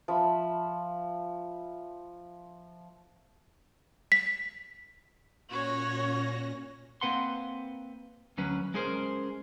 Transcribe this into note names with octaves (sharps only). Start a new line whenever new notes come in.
F3 E5 B5
B6
A#2 C#4 F#4 C#5 A#6
A#3 C4 B4 F#5 C6
D2 F#3 C#4 B4
G#3 C#4 G#4 A#4 C5